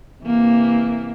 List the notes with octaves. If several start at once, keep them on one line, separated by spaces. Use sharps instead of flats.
C3 E3 A#3